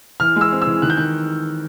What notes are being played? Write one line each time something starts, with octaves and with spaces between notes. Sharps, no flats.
E3 F6
G#3
E6
C4
E6
E3
D#3 F#6
G6
D#3 F#6